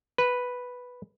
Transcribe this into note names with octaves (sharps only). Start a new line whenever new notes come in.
B4